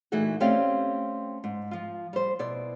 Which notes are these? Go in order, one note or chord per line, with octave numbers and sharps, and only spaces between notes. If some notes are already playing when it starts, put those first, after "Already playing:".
A#2 E3 A3 D#4 F#4 G#4
A3 C4 C#4 G4 D5 F5
G#2
F3 F4
G3 C5
B2 E4 D5